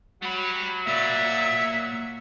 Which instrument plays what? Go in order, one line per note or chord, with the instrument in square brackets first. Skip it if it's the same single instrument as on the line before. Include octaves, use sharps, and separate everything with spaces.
[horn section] F#3 [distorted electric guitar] G3 B5
[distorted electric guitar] A#3 D5 [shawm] E5